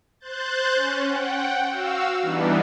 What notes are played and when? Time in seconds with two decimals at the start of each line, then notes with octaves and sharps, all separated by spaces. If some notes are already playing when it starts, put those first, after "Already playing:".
0.20 C5 F#6 G6 A6
0.74 C#4
1.08 F#5 G5
1.67 F#4 F5 E6
2.22 E3 G3 B3 D4 D#4